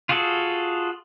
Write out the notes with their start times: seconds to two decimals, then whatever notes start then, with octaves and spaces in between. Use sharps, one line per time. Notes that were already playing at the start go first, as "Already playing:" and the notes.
0.09 F4 F#4 G#4 A4